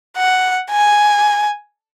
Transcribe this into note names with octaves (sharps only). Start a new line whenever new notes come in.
F#5
G#5